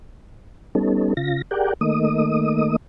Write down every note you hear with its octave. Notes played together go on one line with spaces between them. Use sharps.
G3 B3 C#4 D#4 A4
C#3 F4 A#6
G4 G#4 A#4 D5 F#5 G5
D#3 A3 A#3 D#5 D#6